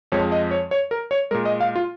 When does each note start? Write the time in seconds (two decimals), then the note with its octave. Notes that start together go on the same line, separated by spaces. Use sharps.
0.12 F2 F3 G#3 C#5
0.32 D#5
0.51 C#5
0.71 C#5
0.91 A#4
1.11 C#5
1.31 A#2 G#3 A#4
1.45 D#5
1.61 F5
1.76 F4